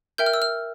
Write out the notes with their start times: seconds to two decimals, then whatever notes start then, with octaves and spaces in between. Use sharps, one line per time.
0.18 A#4 E5 G5 G6
0.26 F6
0.34 E6
0.42 F6